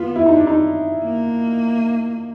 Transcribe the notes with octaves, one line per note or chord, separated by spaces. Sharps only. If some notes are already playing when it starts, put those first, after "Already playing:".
Already playing: B3 F4
E4
D#4
D4
D#4
A#3